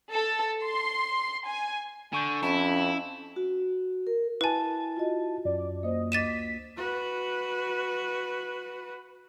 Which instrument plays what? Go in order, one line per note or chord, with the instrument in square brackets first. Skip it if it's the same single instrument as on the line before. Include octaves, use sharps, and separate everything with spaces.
[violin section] A4
C6
G#5
[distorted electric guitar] D3 [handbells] G#5 C#6 G6
[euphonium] F2 [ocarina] C#4 [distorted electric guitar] E4 [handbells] A5
[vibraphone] F#4
A#4
[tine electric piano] E4 A5 [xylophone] B4 G#5
[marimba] F4 F#4 D#5
[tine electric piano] F#2 [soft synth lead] D5
[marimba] A#3 C5 [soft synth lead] D#5
[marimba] D2 D#5 D6 [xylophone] A6 D#7 E7 [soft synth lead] B6
[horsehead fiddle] F#4 B4